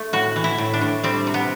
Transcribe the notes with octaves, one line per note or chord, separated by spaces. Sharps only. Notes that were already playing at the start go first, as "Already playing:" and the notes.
Already playing: A3
A2 F#4
E3
E4
A2
D4
A2
G3 C4
C3
B3